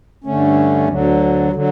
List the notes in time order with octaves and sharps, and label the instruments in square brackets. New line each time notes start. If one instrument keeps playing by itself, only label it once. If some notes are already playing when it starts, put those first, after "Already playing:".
[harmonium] G2 D3 A3 C#4
D2 D3 F#3
D3 F#3